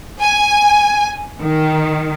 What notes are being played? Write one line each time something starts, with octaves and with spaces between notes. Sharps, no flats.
G#5
D#3